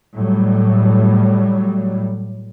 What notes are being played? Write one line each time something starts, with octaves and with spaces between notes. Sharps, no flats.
A2 F#3 G3